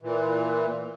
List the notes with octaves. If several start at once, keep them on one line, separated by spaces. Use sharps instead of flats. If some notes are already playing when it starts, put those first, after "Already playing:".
A#2 E3